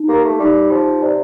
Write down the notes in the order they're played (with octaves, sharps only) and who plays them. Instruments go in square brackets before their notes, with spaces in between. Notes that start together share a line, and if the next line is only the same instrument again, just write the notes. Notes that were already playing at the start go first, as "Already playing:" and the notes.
Already playing: [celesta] D#4
[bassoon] A#3 [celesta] G4
[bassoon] A3
[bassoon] G3 [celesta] D#4
[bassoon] F3 [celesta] G4
[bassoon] C3 [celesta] D5